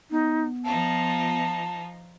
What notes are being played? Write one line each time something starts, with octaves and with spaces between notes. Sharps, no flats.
B3 D#4
F3 D#4 F4 A5